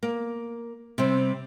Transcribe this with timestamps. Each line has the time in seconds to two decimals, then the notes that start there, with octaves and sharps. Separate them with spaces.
0.03 A#3
0.98 C3 G3 C4